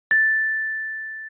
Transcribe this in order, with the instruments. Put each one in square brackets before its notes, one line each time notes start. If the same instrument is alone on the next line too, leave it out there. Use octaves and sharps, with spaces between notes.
[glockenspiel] A6